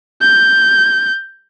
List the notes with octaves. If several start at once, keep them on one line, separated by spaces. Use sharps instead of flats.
G6